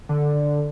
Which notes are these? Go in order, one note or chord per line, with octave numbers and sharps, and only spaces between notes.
D3